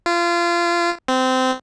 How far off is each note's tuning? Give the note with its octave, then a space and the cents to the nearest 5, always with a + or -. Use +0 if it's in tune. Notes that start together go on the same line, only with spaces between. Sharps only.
F4 -25
C4 -20